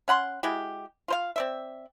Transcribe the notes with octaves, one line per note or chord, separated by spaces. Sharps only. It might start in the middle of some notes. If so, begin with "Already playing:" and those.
C#4 F#5 B5 C6
G#3 E4 F#4 G4
F4 C5 F5
C4 D5 E5